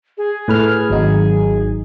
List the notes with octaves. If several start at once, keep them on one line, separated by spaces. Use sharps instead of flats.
G#4
A2 B4 F6
G#1 F#3 D#4